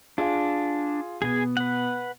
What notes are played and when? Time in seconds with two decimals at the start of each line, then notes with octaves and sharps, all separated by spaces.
0.18 D4 F4 G#4
1.22 B2 B3 G#4 G#5
1.57 B4 F#5